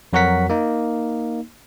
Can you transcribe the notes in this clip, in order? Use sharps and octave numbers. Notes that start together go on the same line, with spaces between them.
F2 F#3 F#4 A#4 F#5 B6
A#3 D#4